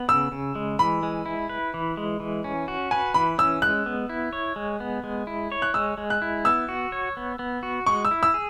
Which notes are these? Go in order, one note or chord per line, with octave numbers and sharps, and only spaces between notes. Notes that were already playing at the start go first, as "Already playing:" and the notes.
Already playing: B3
C#3 E6
C#3
G#3
E3 B5
G#3
E4
B4
E3
G#3
E3
C#4
F#4
B4 G#5
E3 B5
C#4 E6
G#3 F#6
B3
E4
C#5
G#3
B3
G#3
E4
C#5
F#6
G#3 E6
G#3
F#6
E4
B3 E6
F#4
C#5
B3
B3
F#4
G#3 C#6
E6
E4
E6
G#4